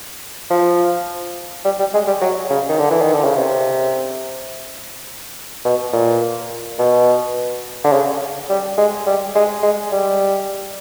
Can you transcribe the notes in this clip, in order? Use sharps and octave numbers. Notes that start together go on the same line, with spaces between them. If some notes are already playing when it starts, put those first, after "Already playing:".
F3
G3
G3
G#3
G3
F#3
C#3
D#3
D3
E3
D#3
D3
C#3
C3
B2
A#2
B2
D3
C#3
G3
G#3
G3
G#3
G#3
G3